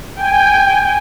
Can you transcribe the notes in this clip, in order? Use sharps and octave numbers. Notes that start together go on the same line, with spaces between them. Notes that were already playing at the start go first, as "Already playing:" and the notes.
G5 G#5